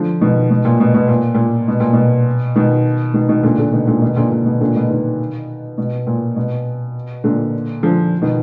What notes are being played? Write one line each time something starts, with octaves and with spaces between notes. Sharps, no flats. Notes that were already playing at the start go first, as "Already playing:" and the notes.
Already playing: D3 F3
B2 D#3
B2
A#2
B2
B2
A#2
A#2
B2
A#2
B2
B2 D#3
B2 D#3
B2 D#3
A#2 D3
A#2 D3
B2 D#3
A#2 D3
B2 D#3
A#2 D3
A#2
B2
A#2 D3
B2
B2 D#3
B2
A#2
B2
A#2 D3
D3 F3
B2 D#3